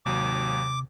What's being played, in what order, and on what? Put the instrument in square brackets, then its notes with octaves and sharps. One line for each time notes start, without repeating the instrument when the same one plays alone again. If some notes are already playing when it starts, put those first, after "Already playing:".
[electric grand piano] G#1 D#2 F#3 [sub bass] C3 [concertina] D6